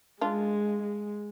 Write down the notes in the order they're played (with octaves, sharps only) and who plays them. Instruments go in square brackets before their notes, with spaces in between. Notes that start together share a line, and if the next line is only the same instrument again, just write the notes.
[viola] G#3 [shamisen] D4 F4
[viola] G#3